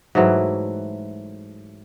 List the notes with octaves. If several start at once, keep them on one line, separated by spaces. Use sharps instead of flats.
G#2 E3 F#3 A3